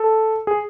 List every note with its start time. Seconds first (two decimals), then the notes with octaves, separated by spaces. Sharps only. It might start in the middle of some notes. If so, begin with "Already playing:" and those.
Already playing: A4
0.47 G#4